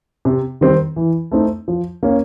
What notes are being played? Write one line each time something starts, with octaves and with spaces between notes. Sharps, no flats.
C3
D#3 G3 C4
E3
A3 C4 D#4
F3
A#3 C#4